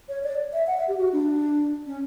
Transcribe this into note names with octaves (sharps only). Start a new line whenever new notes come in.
C#5
D5
E5
F#5
E5
G4
F#4
D4
C#4